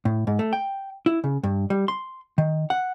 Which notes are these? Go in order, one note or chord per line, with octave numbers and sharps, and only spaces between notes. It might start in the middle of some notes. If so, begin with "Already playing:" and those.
A2
G#2
A3
G5
E4
C#3
G2
G3
C6
D#3
F#5